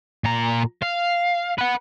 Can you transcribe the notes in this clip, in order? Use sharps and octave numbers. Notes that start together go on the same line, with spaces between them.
A#2 A#5
F5
B4 F#5